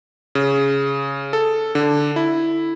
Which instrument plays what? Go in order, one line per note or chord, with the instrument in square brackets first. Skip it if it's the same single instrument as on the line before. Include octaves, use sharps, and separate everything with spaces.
[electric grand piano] C#3
A4
D3
E4